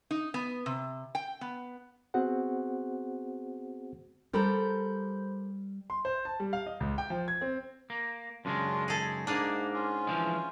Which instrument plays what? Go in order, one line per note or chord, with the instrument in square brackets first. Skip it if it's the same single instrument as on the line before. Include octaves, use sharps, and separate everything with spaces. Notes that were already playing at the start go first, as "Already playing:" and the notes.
[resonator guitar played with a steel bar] D#4
B3
C3
G5
B3
[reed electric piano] B3 C4 F#4 G#4 C5 F#5
[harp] G3 [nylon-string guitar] G4 A4 A#4 [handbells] C5 B5 G6
[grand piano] C6
C5
A5
G3
F5
D#5
C#2
G5
F3
G#6
C4
[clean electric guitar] A#3
[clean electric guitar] F#2 C#3 G#3 [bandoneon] D4 F4
[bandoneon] D#4 [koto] G#4 A4
[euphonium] G#2 [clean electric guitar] A#3 [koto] D4 G#4
[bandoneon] C#4 F4
[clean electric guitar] E3 F3 G#3